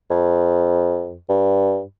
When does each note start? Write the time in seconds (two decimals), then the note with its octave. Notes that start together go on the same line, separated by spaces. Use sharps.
0.10 F2
1.29 G2